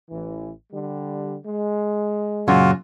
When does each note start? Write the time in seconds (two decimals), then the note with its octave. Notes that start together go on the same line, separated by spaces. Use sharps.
0.10 A1 E3
0.72 D3 G3
1.45 G#3
2.48 F#2 A#2 C#3 F4 F#4